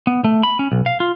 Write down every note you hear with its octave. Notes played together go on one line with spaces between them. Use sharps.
B3
A3
B5
C#4
B1
F5
F4